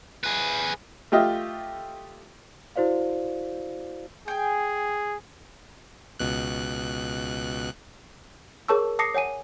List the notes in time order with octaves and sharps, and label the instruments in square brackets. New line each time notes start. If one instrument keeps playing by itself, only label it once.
[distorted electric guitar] G#4 B4
[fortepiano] A3 F4 G4 D#5 E5
[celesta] E4 F#4 C5 D5 F5
[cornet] G#4 [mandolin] G5 G#5
[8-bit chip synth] C#2 B2 F#6
[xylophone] G#4 A#4 C#5 A5 C#6 E6
A5 D6 D#6 A#6 C7 C#7
C#5 F#5 G#5 D#7